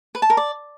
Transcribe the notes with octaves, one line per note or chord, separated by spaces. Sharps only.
B4
A5
A#4
D5